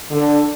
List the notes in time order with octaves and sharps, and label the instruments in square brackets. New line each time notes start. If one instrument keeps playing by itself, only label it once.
[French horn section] D3